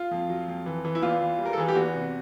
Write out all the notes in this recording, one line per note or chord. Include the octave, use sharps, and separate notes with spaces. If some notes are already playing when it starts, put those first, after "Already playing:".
Already playing: F4
F2
F#3
F2
E3
E3
E4
E2 F4
E3
G3
A#4
A4
E3 G#4
G4
E2 F#4
C3